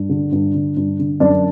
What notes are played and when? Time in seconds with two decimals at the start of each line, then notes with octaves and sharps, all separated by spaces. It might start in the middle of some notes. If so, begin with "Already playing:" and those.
Already playing: G2
0.09 D3
0.32 G2
0.54 D3
0.77 G2
0.99 D3
1.20 F#2 D4